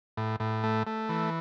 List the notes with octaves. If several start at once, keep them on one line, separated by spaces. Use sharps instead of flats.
A2
A2
A3
A3
E3